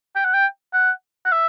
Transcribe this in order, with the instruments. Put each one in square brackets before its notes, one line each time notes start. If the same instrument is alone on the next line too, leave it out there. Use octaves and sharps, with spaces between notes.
[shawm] G5
F#5
G5
F#5
F#5
E5